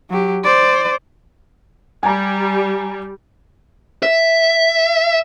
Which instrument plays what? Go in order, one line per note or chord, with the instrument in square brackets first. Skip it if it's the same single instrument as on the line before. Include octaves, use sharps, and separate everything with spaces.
[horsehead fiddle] F#3 G4
C5 D5
[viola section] G3 [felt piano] G#5 A#5
[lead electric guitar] E5